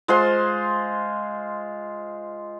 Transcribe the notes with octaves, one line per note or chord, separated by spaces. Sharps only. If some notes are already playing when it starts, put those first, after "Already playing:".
G#3 F4 C5 C6